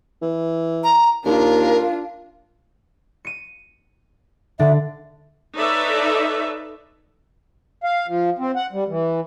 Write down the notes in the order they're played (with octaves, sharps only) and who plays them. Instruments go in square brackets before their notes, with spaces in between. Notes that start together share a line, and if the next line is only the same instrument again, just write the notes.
[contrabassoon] E3
[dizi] A#5
[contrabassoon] D#2 [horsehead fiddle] D4 F4 [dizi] A#4
[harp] C#7 D#7
[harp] D3 D4 [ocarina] E5
[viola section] D#4 A4 B4 C#5 D5 E5
[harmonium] F5
F3
C4
F#5
G3
E3